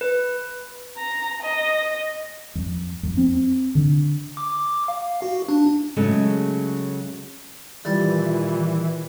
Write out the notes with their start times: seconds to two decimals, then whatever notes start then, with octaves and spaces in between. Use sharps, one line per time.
0.01 B4
0.97 A#5
1.42 D#5
2.55 F2
3.03 F2
3.17 C4
3.75 D3
4.37 D6
4.88 F5
5.22 F#4
5.49 D4
5.96 C#3 F#3 G#3 A3
7.85 A#2 D#3 E3 G3 F4